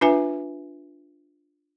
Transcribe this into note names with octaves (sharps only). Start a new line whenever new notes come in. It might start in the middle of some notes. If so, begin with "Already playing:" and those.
D4 F4 B4 E5 G#5